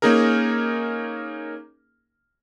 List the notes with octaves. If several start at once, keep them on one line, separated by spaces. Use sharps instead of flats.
A#3 C#4 D#4 G#4 A#4